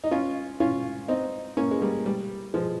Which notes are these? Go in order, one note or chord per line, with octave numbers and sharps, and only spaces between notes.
D#4
C#4 F4
C#4 F4
C4 D#4
A#3 C#4
G#3
G3 A#3
G3
F3 G#3